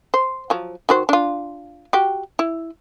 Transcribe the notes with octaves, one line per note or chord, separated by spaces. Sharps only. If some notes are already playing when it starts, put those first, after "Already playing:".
C5
F3 F#3
D#3 F#4 C5
D4 F4
F#4 G4
E4